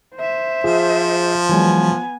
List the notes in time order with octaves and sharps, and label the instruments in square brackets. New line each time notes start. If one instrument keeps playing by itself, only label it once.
[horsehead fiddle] C5 E5
[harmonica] F3 [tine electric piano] F4 G#4
[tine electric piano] E3 F#3 G#3 [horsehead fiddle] B3 G#5